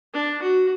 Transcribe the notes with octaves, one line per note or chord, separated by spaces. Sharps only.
D4
F#4